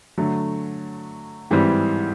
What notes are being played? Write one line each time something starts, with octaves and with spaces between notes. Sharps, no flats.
D3 F#3 A3
G#2 E3 G3 C4